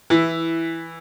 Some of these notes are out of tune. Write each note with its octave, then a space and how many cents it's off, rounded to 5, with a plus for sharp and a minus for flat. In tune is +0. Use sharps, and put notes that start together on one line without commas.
E3 +0 E4 +5